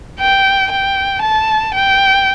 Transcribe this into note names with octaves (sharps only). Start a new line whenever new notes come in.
G5
G5
A5
G5